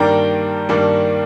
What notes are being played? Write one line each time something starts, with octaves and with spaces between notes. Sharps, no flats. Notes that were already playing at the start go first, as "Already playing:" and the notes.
Already playing: G2 D#3 G3 A#3 D4 G5 A#5
G2 D#3 G3 A#3 D4